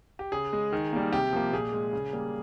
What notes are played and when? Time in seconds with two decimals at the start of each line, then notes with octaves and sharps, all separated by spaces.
0.19 G4
0.32 C#3 G#4
0.53 G#3
0.73 D#3
0.93 G3 A#3
1.13 C3 G4
1.33 F3 A#3
1.53 A#2 G#4
1.73 G#3
1.93 C#3
2.13 G3 A#3